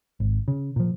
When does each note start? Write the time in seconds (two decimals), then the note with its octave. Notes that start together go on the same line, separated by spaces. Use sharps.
0.20 G#1
0.48 C#3
0.76 A#2 F3